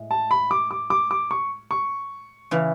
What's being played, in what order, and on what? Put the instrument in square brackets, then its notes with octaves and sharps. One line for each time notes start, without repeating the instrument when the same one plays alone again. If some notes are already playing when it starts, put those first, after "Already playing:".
Already playing: [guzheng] A2 G#3
[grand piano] A5
B5
D6
D6
D6
D6
C#6
C#6
[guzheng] C#3 E3